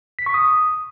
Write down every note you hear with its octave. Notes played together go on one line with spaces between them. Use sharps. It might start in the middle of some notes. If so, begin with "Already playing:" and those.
B6
C#6
D#6